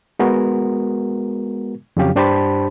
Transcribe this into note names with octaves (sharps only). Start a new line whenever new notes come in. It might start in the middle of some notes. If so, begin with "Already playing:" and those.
G#3 B3 F#4 A#4
F2 C#3 F#3 C#4 G4 F5
G2 D4 G4 C5 A5 B5